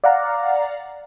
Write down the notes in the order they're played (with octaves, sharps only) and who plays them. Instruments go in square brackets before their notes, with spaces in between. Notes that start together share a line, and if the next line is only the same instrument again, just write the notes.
[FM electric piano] D5 F5 F#5 A#5